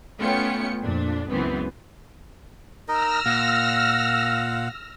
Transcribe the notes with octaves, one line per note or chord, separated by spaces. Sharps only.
A3 B3 C#4 F4 G5 C#7
F2 A#2 D4
C#2 F#2 E3 B3 C4
D#4 A#4 D#5 E6 F6 A#6
A#2 F5 F#5